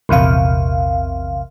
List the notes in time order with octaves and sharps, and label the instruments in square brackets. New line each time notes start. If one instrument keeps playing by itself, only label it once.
[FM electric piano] A#1 E2 C3 F5